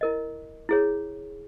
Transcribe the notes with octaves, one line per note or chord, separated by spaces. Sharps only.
E4 A#4 D#5
E4 G#4 C#5